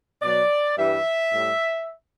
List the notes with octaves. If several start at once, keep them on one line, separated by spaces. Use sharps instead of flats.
B2 F#3 D5
G2 E3 G3 E5
A2 G3